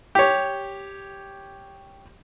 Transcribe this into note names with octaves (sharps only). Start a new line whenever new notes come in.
G4 C#5